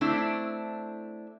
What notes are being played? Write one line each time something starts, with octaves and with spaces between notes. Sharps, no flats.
A3 C4 D4 E4